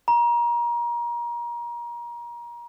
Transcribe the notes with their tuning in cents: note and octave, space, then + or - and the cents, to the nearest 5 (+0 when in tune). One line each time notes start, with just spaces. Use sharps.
A#5 +30